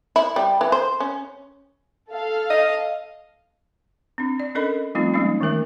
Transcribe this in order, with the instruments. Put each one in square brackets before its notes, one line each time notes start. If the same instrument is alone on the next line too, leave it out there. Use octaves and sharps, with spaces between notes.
[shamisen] E4
G3
E3
C5
C#4
[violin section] A4 F5
[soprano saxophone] D#5
[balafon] C4 D4
D5
C#4 D4 A4 A#4 D#5 B5
F3 G3 A3 C4 D#4 F4
F3 G3 G#3 A#3 C#4 D#4
D#3 E3 A3 A#4 E5